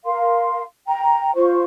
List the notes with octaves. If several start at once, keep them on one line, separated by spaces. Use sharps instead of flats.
A#4 F5 C6
G5 A#5
F4 C5 C#6